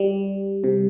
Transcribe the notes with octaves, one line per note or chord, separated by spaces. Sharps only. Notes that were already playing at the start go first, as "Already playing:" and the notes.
Already playing: G3
C3